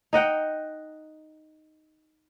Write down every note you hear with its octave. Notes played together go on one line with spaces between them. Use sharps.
D#4 D#5 F#5 G5